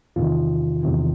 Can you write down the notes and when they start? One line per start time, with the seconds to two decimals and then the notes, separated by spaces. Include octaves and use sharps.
0.16 E2 C3 D#3 F4
0.83 E2 C3 D#3